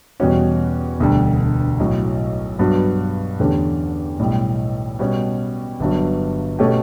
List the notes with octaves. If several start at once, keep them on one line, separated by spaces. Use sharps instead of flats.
E2 B2 G3 C#4 F#4
E1 D2 D3 G3
B1 A2 F#3
G2 F#3 B3 F#4
E2 D3 A3 C#4 G4
B1 A2 G3
B2 G3 C#4 G4
G1 G2 F#3
B2 A3 C#4 G4